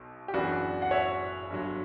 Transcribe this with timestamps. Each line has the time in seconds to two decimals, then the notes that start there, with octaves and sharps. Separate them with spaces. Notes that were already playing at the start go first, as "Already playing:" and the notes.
Already playing: B1 B2
0.28 G4
0.34 F#1 F#2 E3 B3 D4 F#4
0.82 F#5
0.91 C#5 E5
1.50 G1 G2 F#3